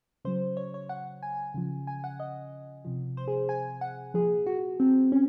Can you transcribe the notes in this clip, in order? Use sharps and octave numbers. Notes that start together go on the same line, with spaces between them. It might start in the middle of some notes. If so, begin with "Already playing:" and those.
C#3 F#3 C5
C#5
C#5
F#5
G#5
C#3 F3
G#5
F#5
D#5
C3 F3
C5
G#4
G#5
F#5
A#2 F3 G#4
F#4
C4
C#4